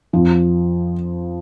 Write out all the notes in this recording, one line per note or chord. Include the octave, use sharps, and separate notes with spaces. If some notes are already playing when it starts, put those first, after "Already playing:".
F2 F3